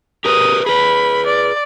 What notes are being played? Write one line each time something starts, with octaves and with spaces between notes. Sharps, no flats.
G4 A#4 B4 D#6
G#4 B4 B5
D5